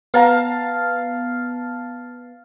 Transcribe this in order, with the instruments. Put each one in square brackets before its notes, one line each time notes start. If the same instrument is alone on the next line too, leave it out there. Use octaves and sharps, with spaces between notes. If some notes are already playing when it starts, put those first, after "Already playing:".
[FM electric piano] B3 [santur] F5 A5 A#5